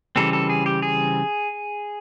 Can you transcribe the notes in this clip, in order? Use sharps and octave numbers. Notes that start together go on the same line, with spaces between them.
C#3 E3 G3 C4 A4
A4
G#4
G4
G#4